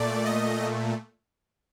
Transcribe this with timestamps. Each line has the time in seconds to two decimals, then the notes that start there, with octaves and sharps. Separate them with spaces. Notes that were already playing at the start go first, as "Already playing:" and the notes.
Already playing: A#2 A3 D5
0.25 D#5